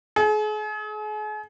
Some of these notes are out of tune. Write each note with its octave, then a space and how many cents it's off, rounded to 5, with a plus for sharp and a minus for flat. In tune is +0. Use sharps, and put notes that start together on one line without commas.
G#4 +40